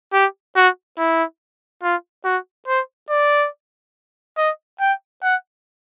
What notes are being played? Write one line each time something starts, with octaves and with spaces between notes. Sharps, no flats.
G4
F#4
E4
F4
F#4
C5
D5
D#5
G5
F#5